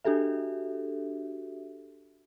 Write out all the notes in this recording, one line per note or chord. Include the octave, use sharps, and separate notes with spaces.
D4 F#4 G4 A4 E5